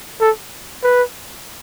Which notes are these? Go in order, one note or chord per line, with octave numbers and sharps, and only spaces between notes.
A4
B4